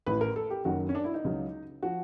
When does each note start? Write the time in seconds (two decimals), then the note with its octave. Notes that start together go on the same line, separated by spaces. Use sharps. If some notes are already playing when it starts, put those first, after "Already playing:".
0.06 A1 A2 E3 B4
0.21 A#4
0.36 A4
0.50 G4
0.65 F#1 F#2 D#3 F#3 F#4
0.89 C#4
0.95 D4
1.04 E4
1.14 D#4
1.24 C#2 C#3 F#3
1.82 F3 F#4